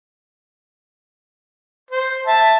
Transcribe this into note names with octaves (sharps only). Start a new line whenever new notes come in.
C5
E5 A5